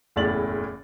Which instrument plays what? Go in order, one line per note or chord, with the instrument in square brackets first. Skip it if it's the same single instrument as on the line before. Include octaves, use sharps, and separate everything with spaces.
[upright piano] F#1 E2 A2 E4 A6 F#7